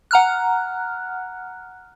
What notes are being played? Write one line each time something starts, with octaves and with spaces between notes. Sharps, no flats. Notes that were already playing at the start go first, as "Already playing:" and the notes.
F#5 A#5 F6 F#6